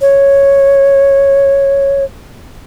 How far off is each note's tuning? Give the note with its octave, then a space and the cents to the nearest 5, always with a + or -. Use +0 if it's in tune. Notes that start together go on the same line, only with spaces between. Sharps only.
C#5 -5